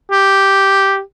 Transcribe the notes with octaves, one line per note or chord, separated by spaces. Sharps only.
G4